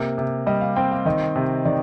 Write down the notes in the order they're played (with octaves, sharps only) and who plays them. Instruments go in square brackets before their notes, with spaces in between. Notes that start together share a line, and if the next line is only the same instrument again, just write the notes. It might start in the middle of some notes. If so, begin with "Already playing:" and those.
Already playing: [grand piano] C3 A#3
C3
[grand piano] G3 [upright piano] D#5
[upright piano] F5
[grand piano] C4 [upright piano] G5
[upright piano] F5
[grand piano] D#3 [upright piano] D#5
[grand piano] C3
[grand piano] D#3 [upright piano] D5